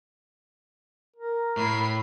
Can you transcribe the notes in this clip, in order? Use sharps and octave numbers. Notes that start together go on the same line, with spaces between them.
A#4
A2 B5 C7